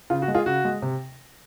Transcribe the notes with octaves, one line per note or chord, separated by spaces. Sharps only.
C#3 F4
F#4
G#3
F4 G#4
C#3 F#4
G#3
C3